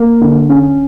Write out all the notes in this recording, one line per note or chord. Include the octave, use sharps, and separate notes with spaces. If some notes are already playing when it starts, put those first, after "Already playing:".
Already playing: A#3
D3
C#4